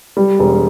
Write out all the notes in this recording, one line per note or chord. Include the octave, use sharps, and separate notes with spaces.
G3
E1